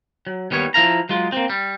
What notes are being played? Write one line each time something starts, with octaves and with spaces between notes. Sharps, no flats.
F#3
D#2 G3 B3 C#5
F3 E4 F5 A#5
F#3 G#3 F4
A#3 C4
G3